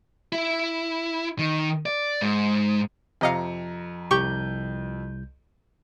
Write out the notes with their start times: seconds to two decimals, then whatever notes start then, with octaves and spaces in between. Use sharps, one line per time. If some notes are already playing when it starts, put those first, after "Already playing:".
0.32 E4
1.39 D#3
1.86 D5
2.21 G#2
3.21 F2 C3 D#5 F5 A#5 C#7
4.11 C2 G4 C#6 G6